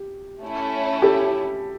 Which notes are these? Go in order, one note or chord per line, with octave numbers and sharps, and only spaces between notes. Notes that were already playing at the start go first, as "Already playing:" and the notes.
Already playing: G4
A3 C#4 E4
G4 A4